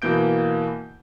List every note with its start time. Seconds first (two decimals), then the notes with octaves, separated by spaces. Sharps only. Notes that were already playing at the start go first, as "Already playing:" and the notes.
0.02 B2 E3 A#3 G6 D7